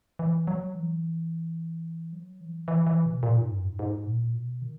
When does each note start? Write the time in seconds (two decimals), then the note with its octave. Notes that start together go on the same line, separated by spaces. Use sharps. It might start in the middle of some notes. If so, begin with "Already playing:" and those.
0.19 E3
0.47 F#3
0.75 E3
2.13 F#3
2.41 E3
2.68 E3
2.87 E3
3.05 B2
3.23 A#2
3.38 G#2
3.51 F#2
3.65 G#2
3.79 G#2
4.06 A#2
4.34 B2
4.62 D#3